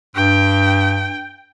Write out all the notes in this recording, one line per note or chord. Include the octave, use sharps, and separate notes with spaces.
G2 G5